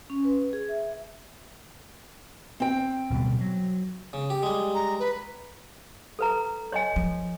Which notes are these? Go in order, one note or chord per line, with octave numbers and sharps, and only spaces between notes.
C#4
B4
G#4
E5
C4 G5
D1 B2 G3
F#3
C#3
G4
G3 G#3
A#5
B4
A4 B4 A#5
C#5 D#5 G#5
F3